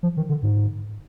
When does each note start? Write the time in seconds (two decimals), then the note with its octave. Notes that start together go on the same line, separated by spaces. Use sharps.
0.03 F3
0.17 D#3
0.29 D3
0.43 G#2